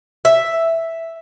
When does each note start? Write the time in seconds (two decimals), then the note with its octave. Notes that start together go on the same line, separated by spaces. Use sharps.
0.25 E5